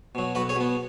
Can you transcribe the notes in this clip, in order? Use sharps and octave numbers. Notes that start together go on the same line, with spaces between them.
B2 F#3
B1 F#4 B4
G#4 C#5
B2 B3